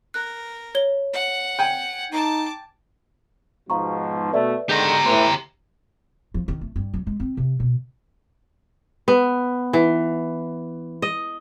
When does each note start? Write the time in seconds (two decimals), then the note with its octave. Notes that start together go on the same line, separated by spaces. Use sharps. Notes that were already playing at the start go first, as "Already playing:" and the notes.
0.14 A#4 F#6
0.75 C#5 G7
1.13 F#5
1.59 G5 G#5
2.11 D#4 A5 D6
3.70 G#2 B2 F3 F5 A#5 C#6
4.33 B2 A3 B4 D5 E5
4.69 D3 D#3 G#3 G4 A#5 G6
5.06 A2 E3 C6 F7
6.34 F3
6.48 D#3
6.61 A3
6.76 G2
6.94 F#3
7.07 G#3
7.20 C4
7.37 C3
7.60 B2
9.08 B3
9.73 E3
11.02 D#5